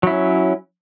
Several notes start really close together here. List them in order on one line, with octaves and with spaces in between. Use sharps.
F#3 E4 C#4